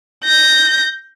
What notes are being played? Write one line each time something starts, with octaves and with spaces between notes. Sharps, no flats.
G6 A#6